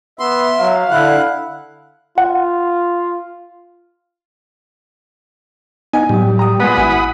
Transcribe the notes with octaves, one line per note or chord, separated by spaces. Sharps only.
B3 E5 C6
F#3 F5
D3 E4 F#5
F4 F#5
B3 D#4 F#5 G#5
A2 F#3 G3
A#5 D#6
A#2 G#3 B3 F#5 B5 D#6
G#1 E4 G#5